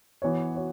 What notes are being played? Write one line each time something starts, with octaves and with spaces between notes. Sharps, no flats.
E3 B3 F#4 C#5
F#4 C#5